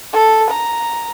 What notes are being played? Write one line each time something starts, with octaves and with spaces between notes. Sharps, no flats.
A4
A#5